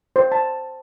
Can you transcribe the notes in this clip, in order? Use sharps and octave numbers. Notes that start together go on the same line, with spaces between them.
C5
A5